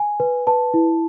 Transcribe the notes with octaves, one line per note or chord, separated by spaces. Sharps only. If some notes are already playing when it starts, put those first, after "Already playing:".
Already playing: G#5
B4
B4 A5
E4